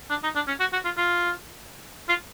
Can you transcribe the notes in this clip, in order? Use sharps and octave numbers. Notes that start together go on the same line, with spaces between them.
D4
D#4
D4
C#4
F#4
F#4
F4
F4
F4